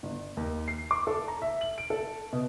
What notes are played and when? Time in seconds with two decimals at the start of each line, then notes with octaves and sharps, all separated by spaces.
0.03 G1
0.37 D#2
0.68 C7
0.91 D6
1.07 A4
1.28 A#5
1.42 E5
1.61 F#7
1.78 D7
1.90 A4
2.33 B2